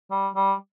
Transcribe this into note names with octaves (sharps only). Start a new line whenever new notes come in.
G3
G3